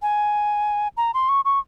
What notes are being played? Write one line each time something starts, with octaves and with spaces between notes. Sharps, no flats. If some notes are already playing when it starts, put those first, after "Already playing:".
G#5
A#5
C6
C#6
C#6